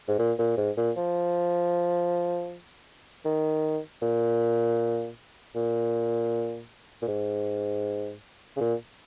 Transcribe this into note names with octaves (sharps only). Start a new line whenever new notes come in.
G#2
A#2
A#2
G#2
A#2
F3
D#3
A#2
A#2
A#2
G#2
C#3
A#2